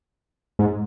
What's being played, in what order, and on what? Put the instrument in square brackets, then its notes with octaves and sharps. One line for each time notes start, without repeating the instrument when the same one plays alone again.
[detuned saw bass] G#2